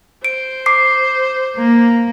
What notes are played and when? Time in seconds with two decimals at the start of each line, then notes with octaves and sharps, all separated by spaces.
0.24 C5 D7
0.66 D6 C7
1.56 A#3